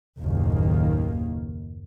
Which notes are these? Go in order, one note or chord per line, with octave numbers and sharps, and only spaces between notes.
F#1 D#2 A2 D#3 A#3